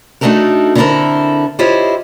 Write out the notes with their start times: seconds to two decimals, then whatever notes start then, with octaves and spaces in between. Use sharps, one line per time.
0.21 A3 D4 D#4 F#4 A4 A#4
0.75 D3 B3 C4 E4 A4 A#4
1.59 E4 F4 G4 C5 C#5 D#5